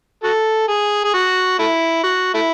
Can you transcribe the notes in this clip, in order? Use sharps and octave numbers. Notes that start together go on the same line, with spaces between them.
F#4 A4
G#4
G#4
F#4
A3 E4
F#4
A3 E4